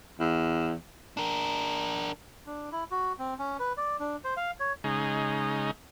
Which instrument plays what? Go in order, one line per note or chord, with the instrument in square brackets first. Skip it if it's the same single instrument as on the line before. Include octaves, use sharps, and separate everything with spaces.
[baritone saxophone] E2
[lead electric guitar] D4 A#4
[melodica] D4
E4
F#4
C4
C#4
B4
D5
D4
C5
F5
C#5
[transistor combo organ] C#3 G#3 D#4